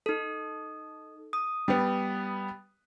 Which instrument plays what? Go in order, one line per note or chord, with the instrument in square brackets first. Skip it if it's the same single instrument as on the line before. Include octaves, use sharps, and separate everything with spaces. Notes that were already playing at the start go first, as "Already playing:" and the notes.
[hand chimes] D#4 A4
D#6
[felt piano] G3 B3